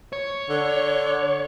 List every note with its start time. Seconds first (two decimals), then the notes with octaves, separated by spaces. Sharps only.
0.13 C#5
0.49 D3